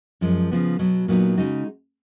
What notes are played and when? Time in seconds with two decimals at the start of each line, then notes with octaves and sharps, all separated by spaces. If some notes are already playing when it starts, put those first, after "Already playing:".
0.21 F#2 F3 G#3
0.51 C#3 F3 B3
0.79 B2 F#3 B3
1.08 A#2 F#3 B3 D#4
1.37 C#3 G#3 D#4 F#4